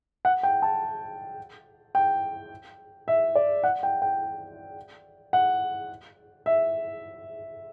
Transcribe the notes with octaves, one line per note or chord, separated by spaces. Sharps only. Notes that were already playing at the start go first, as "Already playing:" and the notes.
F#5
G5
A5
G5
E5
D5
F#5
G5
G5
F#5
E5